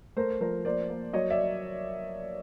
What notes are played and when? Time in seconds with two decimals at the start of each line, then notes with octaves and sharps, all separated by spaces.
0.16 A3 A#4 C5
0.41 F3 A#4 C5
0.65 A#3 C5 D5
0.90 A#3
1.13 F#3 C#5 D#5
1.30 D5 E5